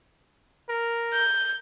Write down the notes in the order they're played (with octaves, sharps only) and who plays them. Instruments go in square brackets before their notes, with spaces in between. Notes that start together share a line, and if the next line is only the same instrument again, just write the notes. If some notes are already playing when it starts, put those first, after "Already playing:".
[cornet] A#4
[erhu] G6